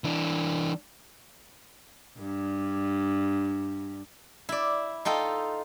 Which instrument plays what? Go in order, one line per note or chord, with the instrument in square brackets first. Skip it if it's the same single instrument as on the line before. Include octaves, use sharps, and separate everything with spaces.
[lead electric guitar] E3 D4
[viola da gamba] G2 G3
[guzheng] E4 D5
D#4 F4 A4 G5